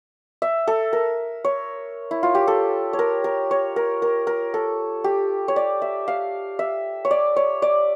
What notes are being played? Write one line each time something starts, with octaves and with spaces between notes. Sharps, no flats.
E5
A4
A#4
C#5
E4
F4
G4
A4
C#5
A#4
A#4
C#5
A#4
A#4
A#4
A4
G4
C#5
D5
E5
F5
E5
C#5
D5
C#5
D5